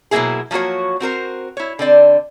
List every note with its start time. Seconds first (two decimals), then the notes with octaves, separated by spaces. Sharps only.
0.11 B2 F#3 A3 A#3 E4 G#4
0.51 F3 F#3 A#3 F#4 C#5
1.00 C4 F#4 A#4 C5
1.57 E4 C#5
1.79 D3 C4 D5